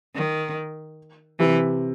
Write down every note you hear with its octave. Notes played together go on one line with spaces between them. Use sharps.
D#3
C3 E3